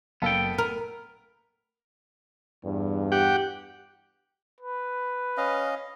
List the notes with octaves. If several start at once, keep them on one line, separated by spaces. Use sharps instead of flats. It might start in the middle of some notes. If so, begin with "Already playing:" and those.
F#1 B3 A4 F5 G5 A5
A#4 B5
E2 G2
G4 F#5 G5
B4
C#4 D#5 F5